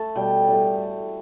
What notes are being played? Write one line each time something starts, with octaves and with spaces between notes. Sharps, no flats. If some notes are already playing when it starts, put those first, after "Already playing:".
Already playing: A3 A5
B2 G3 G5
A2 E3 G3